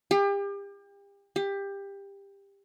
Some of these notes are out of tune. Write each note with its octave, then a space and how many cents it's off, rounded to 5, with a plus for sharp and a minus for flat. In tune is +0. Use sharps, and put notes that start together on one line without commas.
G4 +35
G4 +20